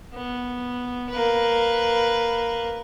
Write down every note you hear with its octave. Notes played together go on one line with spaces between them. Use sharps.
B3
A#3 B4